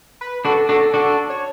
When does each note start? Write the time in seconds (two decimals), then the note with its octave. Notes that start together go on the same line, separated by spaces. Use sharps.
0.21 B4
0.45 D4 F#4 A4
0.69 D4 F#4 A4
0.93 D4 F#4 A4
1.30 C#5